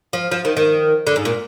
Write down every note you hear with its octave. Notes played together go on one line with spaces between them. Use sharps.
F3
F3
D#3
D#3
D3
G#2
A#2